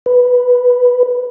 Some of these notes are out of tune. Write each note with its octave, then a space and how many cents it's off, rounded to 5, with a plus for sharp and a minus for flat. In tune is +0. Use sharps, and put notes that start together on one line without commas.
B4 +0